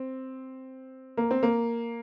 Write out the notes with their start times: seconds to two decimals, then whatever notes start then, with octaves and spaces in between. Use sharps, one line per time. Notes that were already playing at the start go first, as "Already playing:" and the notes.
Already playing: C4
1.17 A#3
1.31 C4
1.43 A#3